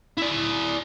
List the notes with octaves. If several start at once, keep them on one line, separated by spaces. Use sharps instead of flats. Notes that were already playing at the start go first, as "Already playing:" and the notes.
E4 D5